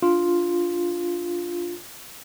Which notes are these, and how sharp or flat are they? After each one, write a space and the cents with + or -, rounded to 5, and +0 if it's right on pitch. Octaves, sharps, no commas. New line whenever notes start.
D4 +0 F4 +0